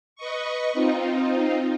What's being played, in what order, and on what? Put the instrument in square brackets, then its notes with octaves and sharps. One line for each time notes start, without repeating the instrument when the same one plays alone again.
[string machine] B4 D#5 C#6
C4 D#4 F4